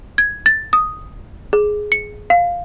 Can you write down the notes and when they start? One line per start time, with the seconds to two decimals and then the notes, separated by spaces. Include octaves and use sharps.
0.18 G#6
0.46 A6
0.73 D#6
1.53 G#4
1.92 C#7
2.30 F5